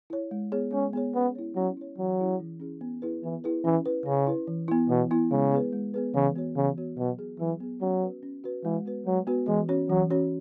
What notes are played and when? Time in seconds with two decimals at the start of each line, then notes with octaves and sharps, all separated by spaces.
0.10 E4 C#5
0.31 G#3
0.52 B3 G#4 C#5
0.73 G#3 C#4
0.93 B3 G#4 C#5
1.15 B3 C#4
1.35 E4 C#5
1.56 F#3 C#4
1.77 E4 C#5
1.98 E3 F#3
2.18 C#4 E4 G#4
2.40 E3
2.60 C#4 E4 G#4
2.81 B3
3.02 E4 G#4 B4
3.23 E3 B3
3.44 E4 G#4 B4
3.65 E3 C#4
3.86 E4 B4
4.06 C#3 C#4
4.27 E4 B4
4.47 E3
4.68 B3 E4
4.89 B2 E3
5.11 B3 E4
5.31 C#3 G#3
5.52 B3 G#4 B4
5.73 G#3
5.94 B3 G#4 B4
6.14 C#3 E3
6.36 B3 F#4 C#5
6.56 C#3 E3
6.78 B3 F#4 C#5
6.98 B2 F#3
7.19 B3 G#4
7.40 E3 F#3
7.60 B3 G#4
7.81 F#3 C#4
8.02 F#4 B4
8.23 C#4
8.44 F#4 B4
8.64 E3 G#3
8.85 B3 F#4 B4
9.06 F#3 G#3
9.27 B3 F#4 B4
9.48 E3 G#3
9.69 C#4 F#4 C#5
9.90 E3 F#3
10.10 C#4 F#4 C#5